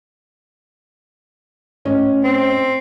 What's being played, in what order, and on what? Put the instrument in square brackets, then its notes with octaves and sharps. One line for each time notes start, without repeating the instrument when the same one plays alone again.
[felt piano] A2 C#4 D#5
[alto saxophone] C4